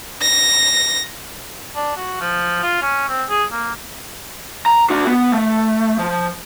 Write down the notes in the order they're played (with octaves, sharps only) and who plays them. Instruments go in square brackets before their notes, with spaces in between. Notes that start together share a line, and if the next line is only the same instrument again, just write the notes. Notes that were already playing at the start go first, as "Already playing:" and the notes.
[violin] A#6
[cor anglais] D4
F#4
F3
F4
C#4
C4
G#4
A#3
[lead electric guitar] A#5
D4 F#4
B3
A3
F3